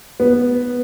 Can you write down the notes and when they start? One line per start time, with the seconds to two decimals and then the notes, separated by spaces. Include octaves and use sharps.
0.20 B3